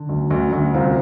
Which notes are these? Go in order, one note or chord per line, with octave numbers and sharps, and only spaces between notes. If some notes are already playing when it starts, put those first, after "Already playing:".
Already playing: D3
D2
D2
D2
C2 C4 F4